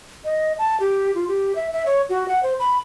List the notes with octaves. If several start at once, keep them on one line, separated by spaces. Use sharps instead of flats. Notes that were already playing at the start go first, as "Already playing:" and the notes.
D#5
A5
G4
F4
G4
E5
E5
C#5
F#4
F#5
C5
B5